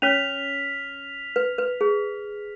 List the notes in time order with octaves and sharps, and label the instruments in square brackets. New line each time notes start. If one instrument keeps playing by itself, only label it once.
[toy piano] C#4 C#5 [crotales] F6 B6 F7
[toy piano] B4
B4
G#4